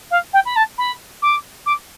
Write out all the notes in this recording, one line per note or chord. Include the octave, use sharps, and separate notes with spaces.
F5
G5
B5
A5
B5
D6
D6